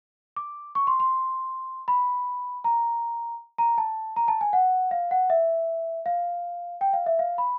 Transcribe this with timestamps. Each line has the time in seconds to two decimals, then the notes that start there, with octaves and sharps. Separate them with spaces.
0.36 D6
0.75 C#6
0.87 C6
1.00 C6
1.88 B5
2.64 A#5
3.58 A#5
3.78 A5
4.16 A#5
4.28 A5
4.41 G#5
4.53 F#5
4.91 F5
5.11 F#5
5.30 E5
6.06 F5
6.81 G5
6.93 F5
7.06 E5
7.19 F5
7.38 B5